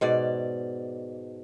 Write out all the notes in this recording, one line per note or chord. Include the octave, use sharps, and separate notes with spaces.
G#2 B2 D5